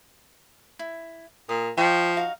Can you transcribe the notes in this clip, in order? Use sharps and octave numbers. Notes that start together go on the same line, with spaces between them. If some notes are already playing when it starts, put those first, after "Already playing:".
E4
A#2 D#6
F3 D#5 G5 C#6
D#4 F#4 F5